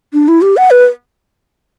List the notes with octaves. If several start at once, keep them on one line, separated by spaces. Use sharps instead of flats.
D4
E4
G4
F#5
B4